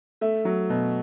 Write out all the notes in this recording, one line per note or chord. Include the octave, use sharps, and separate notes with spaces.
A3 E5
F#3
B2